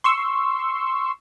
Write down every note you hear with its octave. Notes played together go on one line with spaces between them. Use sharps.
C6 C#6 E6